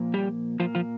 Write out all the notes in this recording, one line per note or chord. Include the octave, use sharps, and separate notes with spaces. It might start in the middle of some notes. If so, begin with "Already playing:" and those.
Already playing: A#2 F3 A#3
G3 G4
A#2 F3 A#3 F4
F3 F4